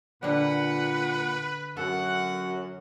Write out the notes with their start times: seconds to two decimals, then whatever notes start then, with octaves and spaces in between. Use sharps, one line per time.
0.23 A#2 D3 G3 B4 F#5
1.77 F#2 A4 F#5